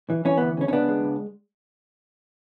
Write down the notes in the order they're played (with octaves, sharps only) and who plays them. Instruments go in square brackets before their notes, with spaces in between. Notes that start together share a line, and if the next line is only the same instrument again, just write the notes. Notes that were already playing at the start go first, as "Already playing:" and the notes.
[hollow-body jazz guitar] E3
E3 C#4
D2 B3
C#3 C#4
C#4
C#2 B3 D4
G#3
C#2